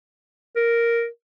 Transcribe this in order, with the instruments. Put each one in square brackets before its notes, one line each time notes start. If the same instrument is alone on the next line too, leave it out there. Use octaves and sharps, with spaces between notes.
[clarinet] A#4